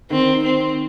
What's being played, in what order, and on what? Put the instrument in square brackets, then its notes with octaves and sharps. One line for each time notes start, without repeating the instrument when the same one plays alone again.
[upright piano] D#3 [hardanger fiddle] C4
[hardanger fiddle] C4